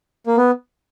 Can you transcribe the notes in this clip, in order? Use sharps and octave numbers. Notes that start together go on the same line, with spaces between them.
A#3
B3